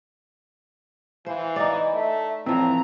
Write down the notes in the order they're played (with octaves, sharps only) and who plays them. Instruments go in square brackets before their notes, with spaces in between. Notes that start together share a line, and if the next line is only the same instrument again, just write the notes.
[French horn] E3 [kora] C5 [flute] F5
[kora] D#4 D5
[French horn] A3 [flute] E5
[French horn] A2 [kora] E3 F3 [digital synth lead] C4 [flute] A#5